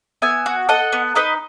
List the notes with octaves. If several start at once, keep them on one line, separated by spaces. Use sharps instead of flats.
B3 E5 G#5
F#4
A4 D#5 F#5
B3
D#4 B4 D#5